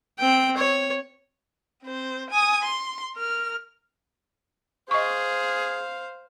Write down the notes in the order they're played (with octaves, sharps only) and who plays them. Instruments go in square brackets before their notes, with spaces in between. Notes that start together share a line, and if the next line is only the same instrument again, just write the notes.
[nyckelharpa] C4 G5
C#5
[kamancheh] C4 C5
G#5 D#6
C6
A#4 F6
[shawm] G#4 [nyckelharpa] C5 F5 [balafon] D#5 C#6